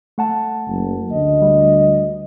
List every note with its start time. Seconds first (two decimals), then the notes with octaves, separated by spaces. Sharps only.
0.18 A3 F#5 A5
0.68 F#1
1.10 D2 D#5
1.42 G3